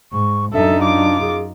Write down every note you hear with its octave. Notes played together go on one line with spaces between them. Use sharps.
G#2 C#6
F#2 D4 D#4 A4 E5
F4 D6
G#4